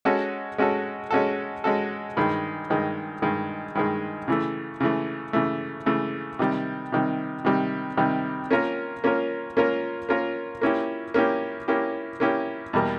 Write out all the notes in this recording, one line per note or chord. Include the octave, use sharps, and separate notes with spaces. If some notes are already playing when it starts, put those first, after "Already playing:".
G#3 C#4 F#4 A4
G#3 C#4 F#4 A4
G#3 C#4 F#4 A4
G#3 C#4 F#4 A4
G2 D#3 G#3
G2 D#3 G#3
G2 D#3 G#3
G2 D#3 G#3
C#3 E3 A3
C#3 E3 A3
C#3 E3 A3
C#3 E3 A3
C3 D#3 G3
C3 D#3 G3
C3 D#3 G3
C3 D#3 G3
A#3 C#4 F4 A#4
A#3 C#4 F4 A#4
A#3 C#4 F4 A#4
A#3 C#4 F4 A#4
A#3 C#4 E4 G4
A#3 C#4 E4 G4
A#3 C#4 E4 G4
A#3 C#4 E4 G4
E2 B2 G3 A#3